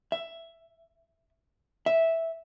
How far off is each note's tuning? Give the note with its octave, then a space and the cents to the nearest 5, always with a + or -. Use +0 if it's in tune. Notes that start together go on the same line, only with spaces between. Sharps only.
E5 +10
E5 -5